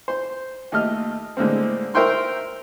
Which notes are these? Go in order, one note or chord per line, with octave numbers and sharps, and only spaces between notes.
C5
D#2 A3 D#5 F6
A2 D3 G#3 A#3 C4
A#4 C5 E5 G5 C6 C#6